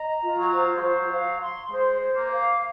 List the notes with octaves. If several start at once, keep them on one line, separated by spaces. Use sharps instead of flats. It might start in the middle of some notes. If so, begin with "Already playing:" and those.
Already playing: D#5 A#5
F4
F#3
C5
G#3
F#3 C5
F5
C6
G#3 C5
C5
A#3
F5